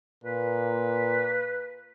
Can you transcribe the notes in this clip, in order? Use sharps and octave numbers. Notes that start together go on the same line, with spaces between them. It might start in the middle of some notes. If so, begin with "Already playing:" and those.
A#2 B4